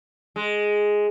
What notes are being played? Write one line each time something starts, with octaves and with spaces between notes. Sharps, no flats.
G#3